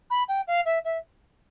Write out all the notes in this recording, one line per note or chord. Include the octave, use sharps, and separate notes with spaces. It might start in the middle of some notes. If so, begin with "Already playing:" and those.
B5
G5
F5
E5
E5